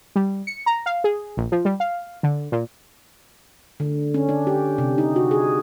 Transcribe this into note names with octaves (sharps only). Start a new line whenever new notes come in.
G3
C#7
A#5
F5
G#4
A#1
F3
G3
F5
D3
A#2
D3
C#4
D4
G4
C3
D#4
F#4
G#4